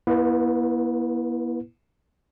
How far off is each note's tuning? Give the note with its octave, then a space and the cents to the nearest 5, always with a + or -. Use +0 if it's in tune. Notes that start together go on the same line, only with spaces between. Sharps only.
B3 -45 E4 +0 B4 +0